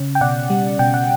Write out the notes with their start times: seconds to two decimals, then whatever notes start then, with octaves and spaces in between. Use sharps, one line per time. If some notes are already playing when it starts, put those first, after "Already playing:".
Already playing: C#3 C#4
0.15 G5
0.21 B2 D5 F#5
0.50 G3
0.79 B2 G5
0.94 F#5